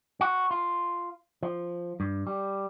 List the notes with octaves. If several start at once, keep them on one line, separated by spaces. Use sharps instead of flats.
F#4
F4
F3
G2
G3